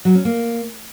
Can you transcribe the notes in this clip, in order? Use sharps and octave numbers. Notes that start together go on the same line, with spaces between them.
F#3
C#4
A#3